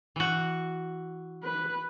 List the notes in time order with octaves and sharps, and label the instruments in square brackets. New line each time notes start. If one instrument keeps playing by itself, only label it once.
[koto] E3 F#4
[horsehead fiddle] B4